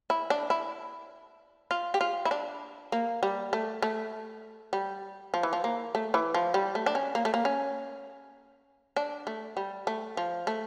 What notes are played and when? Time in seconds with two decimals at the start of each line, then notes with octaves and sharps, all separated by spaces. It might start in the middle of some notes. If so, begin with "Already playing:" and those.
0.10 E4
0.30 D4
0.50 E4
1.71 F4
1.94 G4
2.01 F4
2.25 E4
2.31 D4
2.92 A#3
3.23 G3
3.53 A3
3.82 A3
4.73 G3
5.34 F3
5.43 E3
5.53 F3
5.64 A#3
5.95 A3
6.14 E3
6.34 F3
6.54 G3
6.75 A3
6.86 D4
6.95 C#4
7.15 A#3
7.25 A3
7.34 A#3
7.45 C#4
8.96 D4
9.27 A3
9.57 G3
9.87 A3
10.17 F3
10.47 A3